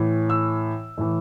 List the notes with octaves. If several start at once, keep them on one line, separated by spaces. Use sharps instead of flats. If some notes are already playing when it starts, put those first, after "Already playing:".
Already playing: A2 E3
E6
A2 E3